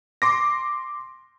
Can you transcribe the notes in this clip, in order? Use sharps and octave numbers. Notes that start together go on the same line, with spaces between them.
C6 D6 A#6